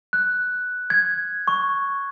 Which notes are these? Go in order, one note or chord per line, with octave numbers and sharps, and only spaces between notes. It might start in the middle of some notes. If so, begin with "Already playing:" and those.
F#6
G#6
C#6